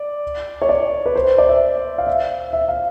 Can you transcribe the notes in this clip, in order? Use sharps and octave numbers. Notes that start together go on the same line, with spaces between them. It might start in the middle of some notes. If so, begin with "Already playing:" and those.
Already playing: D5
C#5
D5
B4
C5
D5
E5
F5
E5
E5
F5